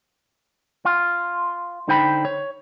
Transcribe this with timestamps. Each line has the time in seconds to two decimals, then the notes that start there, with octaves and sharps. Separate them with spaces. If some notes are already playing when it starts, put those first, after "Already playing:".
0.85 F4
1.88 D3 D#4 C5 G5 B5
2.25 C#5